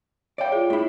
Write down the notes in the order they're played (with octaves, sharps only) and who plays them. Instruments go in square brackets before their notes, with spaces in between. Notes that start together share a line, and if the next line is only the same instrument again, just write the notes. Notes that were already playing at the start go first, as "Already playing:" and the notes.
[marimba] C#5 E5 F5 [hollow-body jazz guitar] D5 G5
[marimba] F4 G#4
[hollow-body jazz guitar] A2 E4 [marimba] G#4 E5